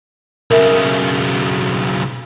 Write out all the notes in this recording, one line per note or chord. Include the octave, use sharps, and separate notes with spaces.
B1 C#3 A#4 E5